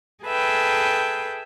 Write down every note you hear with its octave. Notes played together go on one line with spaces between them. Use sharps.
G#4 A4 B4 E5 G5